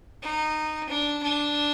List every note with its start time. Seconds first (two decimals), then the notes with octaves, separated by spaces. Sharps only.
0.22 D#4
0.88 D4
1.23 D4